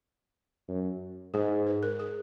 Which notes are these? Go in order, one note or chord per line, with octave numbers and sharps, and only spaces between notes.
F#2
G#2 G#4
B4
A#4
G#4